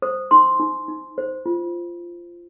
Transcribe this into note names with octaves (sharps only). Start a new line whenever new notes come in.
C5 D#6
D#4 C6
D#4
D#4
C5
F4